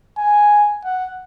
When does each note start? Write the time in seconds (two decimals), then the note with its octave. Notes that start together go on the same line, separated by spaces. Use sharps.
0.18 G#5
0.84 F#5